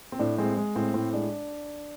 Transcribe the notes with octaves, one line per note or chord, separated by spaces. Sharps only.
C4
A2 D4
G#3 C4
G#3
A2 C4
A2 C4
G#3 D4